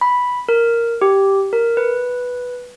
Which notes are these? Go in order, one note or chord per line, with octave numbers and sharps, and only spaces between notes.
B5
A#4
G4
A#4
B4